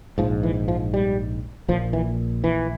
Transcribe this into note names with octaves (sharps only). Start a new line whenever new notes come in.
A#1 G#2 F3
E3
F3
G3
A#1 A#2 F3
E3
E3